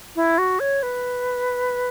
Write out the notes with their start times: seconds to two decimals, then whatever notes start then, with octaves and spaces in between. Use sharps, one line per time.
0.16 E4
0.38 F#4
0.60 C#5
0.83 B4